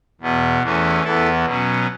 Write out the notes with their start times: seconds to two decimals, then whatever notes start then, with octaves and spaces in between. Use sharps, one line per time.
0.21 E2 B2 B3
0.62 E2 E3 A3 C#4
1.03 E2 E3 B3 E4 A4
1.45 B2 F#3 C#4